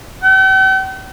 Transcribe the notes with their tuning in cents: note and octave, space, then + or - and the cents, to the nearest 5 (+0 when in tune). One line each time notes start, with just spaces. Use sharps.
G5 -45